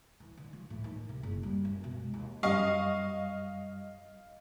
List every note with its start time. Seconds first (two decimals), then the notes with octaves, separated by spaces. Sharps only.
0.20 E3
0.37 D3
0.53 F3
0.70 A2
0.84 D#3
1.09 C3
1.23 F#1
1.43 G3
1.65 F#2
1.84 B2
2.00 G#3
2.14 D#2
2.43 F#2 G3 D#5 F5 C#6